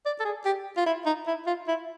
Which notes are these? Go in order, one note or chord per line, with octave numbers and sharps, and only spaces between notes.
D5
A4
G#4
G4
F4
E4
D#4
E4
F4
E4